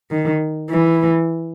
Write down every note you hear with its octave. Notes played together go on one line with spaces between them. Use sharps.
D#3
E3